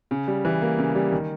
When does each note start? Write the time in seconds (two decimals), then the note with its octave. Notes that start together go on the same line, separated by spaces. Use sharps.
0.11 C#3
0.28 G3
0.45 E3
0.62 A#3
0.78 C#3
0.95 G3
1.12 D#3